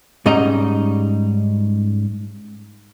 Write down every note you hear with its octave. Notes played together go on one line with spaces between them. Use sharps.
G#2 G3 C#4 D#4 D#5 A#5